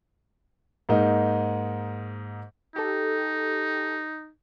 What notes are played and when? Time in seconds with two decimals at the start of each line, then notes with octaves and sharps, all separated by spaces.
0.89 G#2 A#3 D#4
2.76 D#4 G4 A4